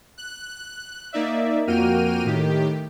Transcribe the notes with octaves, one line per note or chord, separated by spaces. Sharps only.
F#6
A#3 D#4 D5 E5
F2 A#3 F#4 G5 F6 D#7
A2 D#3 G4